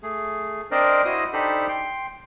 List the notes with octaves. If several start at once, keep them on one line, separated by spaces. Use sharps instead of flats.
A3 G#4
C4 D4 A#4 C5 D5 D#5
E4 F#4 C5 D#5 D#6
D4 D#4 G4 A4 C5 B5
G5 C6